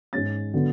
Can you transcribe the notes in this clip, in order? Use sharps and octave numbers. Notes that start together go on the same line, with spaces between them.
G#2 G#3 C#4 A6
D3 F#3 B3